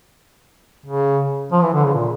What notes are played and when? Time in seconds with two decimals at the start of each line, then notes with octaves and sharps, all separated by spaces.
0.86 C#3
1.52 F3
1.63 E3
1.74 D3
1.85 C#3
1.94 A#2